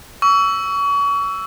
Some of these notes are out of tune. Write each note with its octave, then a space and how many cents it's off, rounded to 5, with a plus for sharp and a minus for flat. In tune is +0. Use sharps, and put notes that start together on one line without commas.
C#6 +35 E6 +5